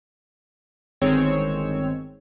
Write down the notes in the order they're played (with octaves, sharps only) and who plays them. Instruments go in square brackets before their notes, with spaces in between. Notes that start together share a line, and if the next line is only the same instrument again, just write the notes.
[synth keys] G1 D#3 G#3 C4 C#5 E6